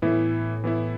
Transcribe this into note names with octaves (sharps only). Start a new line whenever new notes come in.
A2 E3 B3 E4
E3 B3 E4